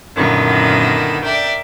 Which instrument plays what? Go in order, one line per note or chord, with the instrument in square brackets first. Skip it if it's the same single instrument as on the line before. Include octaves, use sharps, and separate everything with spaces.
[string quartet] F#2 A#2 D3 D#3 B3 E4
A#4 D5 E5 G5